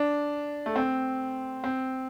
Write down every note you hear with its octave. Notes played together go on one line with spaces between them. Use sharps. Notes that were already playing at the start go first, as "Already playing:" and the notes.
Already playing: D4
A3
C4
C4